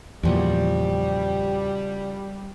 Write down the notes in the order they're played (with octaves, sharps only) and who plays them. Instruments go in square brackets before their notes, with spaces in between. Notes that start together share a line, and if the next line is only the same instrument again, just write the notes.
[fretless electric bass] E2 A#2 [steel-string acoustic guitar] C#3 F3 F#4 [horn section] G3